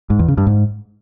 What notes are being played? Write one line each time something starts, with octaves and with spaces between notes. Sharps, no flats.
G#2
E2
C#3
G2
G#2